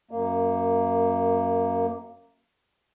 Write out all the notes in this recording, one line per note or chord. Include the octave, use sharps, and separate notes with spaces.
F#2 A#3